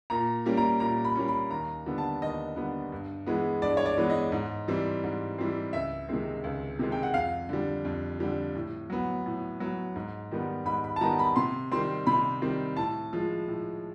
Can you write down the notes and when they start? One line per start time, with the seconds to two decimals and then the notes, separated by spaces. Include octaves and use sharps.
0.10 A#2 A#5
0.46 G3 A#3 C#4
0.57 A#5
0.80 A#2 A#5
1.04 B5
1.16 G3 A#3 C#4
1.28 B5
1.51 D#2 A#5
1.86 D3 G3 B3
1.98 A5
2.22 D#2 D#5
2.56 D3 G3 B3
2.92 G2
3.26 E3 G#3 B3
3.62 G2 D5
3.77 C#5
3.86 D5
3.97 E3 G#3 B3
4.10 D#5
4.32 G#2
4.68 E3 G3 C4
5.04 G#2
5.38 E3 G3 C4
5.73 C#2 E5
6.09 C3 D#3 G#3 C4
6.44 C#2
6.79 C3 D#3 G#3 C4
6.92 G5
7.03 F#5
7.14 F2 F5
7.49 D3 G3
7.85 F2
8.20 D3 G3
8.55 A2
8.90 F#3 B3
9.26 A2
9.60 F#3 B3
9.96 G#2
10.31 D#3 G3 B3
10.65 G#2 B5
10.84 B5
10.96 A5
11.01 D#3 G3 B3 A#5
11.19 B5
11.36 C3 C6
11.72 D#3 G3 C4 C6
12.06 C3 B5
12.42 D#3 G3 C4
12.76 A2 A5
13.13 F3 G#3
13.48 A2